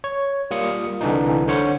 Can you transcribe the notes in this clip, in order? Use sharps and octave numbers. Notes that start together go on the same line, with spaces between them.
C#5
G3 A#3 F4 D#6 C#7
C2 D3 E3 D4 D#4
D3 C5 C#5 C#7